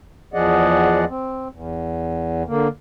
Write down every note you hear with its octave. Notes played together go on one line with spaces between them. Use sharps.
E2 F3 G#4 D5 D#5 F#5
C4
E2
D3 A#3